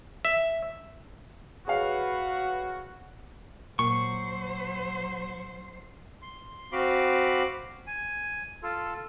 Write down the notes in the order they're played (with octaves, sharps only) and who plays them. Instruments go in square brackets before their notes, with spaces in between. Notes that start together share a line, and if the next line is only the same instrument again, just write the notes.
[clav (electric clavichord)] E5
[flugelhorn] F#4 [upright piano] G#4 C#5 F5 [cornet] B4
[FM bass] A#2 [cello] F#3 C5 [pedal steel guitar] C#6
[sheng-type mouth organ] C6
C4 F#4 F5 B5 D6
G#5
F4 A4